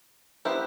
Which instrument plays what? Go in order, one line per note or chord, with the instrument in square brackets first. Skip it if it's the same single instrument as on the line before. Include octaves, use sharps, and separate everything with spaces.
[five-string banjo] B3 E4 G4 C5